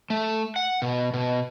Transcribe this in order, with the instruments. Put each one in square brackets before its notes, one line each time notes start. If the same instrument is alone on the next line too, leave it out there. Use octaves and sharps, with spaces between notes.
[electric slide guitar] A3
F#5
B2
B2